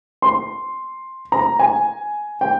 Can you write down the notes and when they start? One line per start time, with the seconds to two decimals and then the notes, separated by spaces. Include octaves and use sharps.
0.22 C6
1.32 A#5
1.59 G#5
2.41 G5